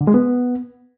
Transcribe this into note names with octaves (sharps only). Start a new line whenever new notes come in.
D3
G#3
B3